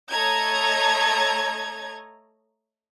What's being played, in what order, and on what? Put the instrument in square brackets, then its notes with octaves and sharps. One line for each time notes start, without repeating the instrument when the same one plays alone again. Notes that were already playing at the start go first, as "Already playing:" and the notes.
[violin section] A3 A4 C#5 D#5 A#5 G#6